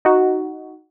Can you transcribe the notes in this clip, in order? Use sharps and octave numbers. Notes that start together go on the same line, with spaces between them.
D#4 F#4